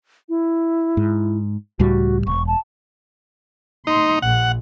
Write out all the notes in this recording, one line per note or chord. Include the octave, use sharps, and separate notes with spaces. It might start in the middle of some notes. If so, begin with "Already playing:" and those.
E4
G#2
C#2 A2 G3 F#4
E1 C#6
A5
D#4 C6
A#1 F#5